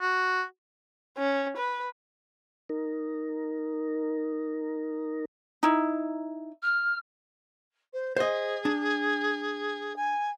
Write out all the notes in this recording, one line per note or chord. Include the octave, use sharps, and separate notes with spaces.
F#4
C#4
B4
D#4 A#4
D#4 E4
F6
C5
G#4 C5 D#5
D4
G#5